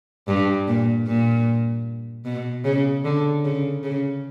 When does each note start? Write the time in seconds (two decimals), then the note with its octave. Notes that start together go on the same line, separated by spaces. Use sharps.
0.28 G2
0.68 A#2
1.07 A#2
2.25 B2
2.65 C#3
3.05 D3
3.45 C#3
3.83 C#3